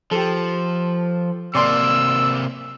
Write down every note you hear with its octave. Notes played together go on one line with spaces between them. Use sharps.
F3 G4 A4
C3 A#3 D5 C6 E6